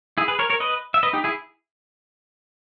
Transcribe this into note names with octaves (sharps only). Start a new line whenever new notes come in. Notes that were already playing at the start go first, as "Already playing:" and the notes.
E4 G#4
G#4 B4
A#4 C#5
A#4 C#5
B4 D#5
E5
B4 D#5
D#4 G4
E4 G#4